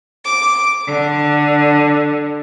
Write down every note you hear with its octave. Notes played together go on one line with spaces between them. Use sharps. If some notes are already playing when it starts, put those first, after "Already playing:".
D6
D3